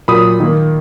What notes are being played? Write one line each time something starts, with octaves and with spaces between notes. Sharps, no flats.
A#2 F#3 A#3 B5 D#6
D#3 A#3